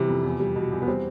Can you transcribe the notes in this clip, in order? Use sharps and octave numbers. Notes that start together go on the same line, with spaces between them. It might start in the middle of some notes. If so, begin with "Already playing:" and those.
Already playing: C3 E3 G3
F2
E2
G3
B2
E2
B3
G3 C4